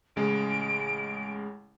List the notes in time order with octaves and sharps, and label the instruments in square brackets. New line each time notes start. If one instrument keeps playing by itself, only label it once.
[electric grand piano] A1 C#3 G#3 [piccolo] D7